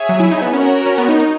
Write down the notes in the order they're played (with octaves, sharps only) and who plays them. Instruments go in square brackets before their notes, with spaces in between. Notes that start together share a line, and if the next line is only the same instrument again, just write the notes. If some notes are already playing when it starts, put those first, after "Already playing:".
Already playing: [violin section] G#4 C#5 E5 G#5
[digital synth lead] F#3
E4
D#4
B3
[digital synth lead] C#4 [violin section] F#4 A#4 C#5
[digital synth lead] C#4
B3
D#4
D#4